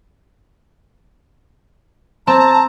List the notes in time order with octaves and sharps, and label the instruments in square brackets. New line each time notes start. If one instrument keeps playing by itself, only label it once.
[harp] C4 [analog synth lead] A5 [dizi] A#5